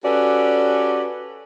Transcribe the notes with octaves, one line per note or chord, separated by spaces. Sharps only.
C#4 F#4 G4 A4 B4 D5